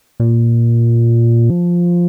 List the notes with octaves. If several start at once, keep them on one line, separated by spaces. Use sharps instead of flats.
A#2
F3